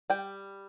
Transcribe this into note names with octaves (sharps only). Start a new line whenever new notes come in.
G3 G5